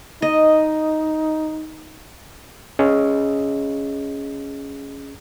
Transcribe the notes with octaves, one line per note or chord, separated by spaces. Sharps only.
D#4 D#5
C#4 G#4 D#5